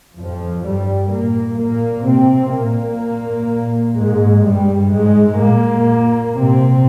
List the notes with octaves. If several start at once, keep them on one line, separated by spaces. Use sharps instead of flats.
F2 F3
G2 G3
A#2 A#3
A#2 A#3
C3 C4
A#2 A#3
G#2 G#3
G2 G3
G#2 G#3
A#2 A#3
C3 C4